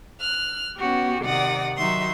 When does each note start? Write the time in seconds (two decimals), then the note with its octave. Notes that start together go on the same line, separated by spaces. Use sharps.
0.21 F6 F#6
0.78 B3 C#4 F#4 G4
1.23 C3 D#3 D5 F#5 D#6 A#6
1.79 D#3 F#3 D#4 F#4 E5 C6